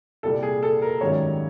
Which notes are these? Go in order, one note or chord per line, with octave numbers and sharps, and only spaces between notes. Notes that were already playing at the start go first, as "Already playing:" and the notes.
C2 A#2 G3 A4
G#4
A4
A#4
G#1 F#2 D#3 G3 C#5